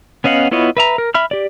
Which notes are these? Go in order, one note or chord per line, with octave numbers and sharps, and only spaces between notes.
B3 C#4 D#5 F5 F#5
B3 E4 F4 C#5 D#5
B4 E5 A#5
A#4
E5 B5 F6
G4 D5